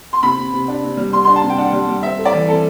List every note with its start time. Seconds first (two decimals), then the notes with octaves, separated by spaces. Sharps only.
0.13 C6
0.23 C3 B5
0.37 C3
0.53 C3
0.68 D4
0.83 C3
0.97 G3
1.13 G3 C6
1.25 D4 C6
1.36 A5
1.43 C3
1.50 G5
1.58 D4 F#5
1.73 G3
1.88 G3
2.02 C4 E5
2.18 A3
2.25 D5
2.34 E3
2.48 C4 A4